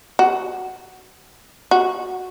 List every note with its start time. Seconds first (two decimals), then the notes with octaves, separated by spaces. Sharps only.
0.19 F#4
1.71 F#4